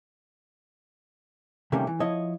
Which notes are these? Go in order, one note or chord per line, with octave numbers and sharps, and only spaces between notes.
C3 D#3 G3 A3 A#3 C#4
E3
F3 E4 C#5 D#5